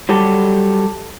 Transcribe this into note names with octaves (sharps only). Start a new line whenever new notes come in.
F#3 G3 G4 A4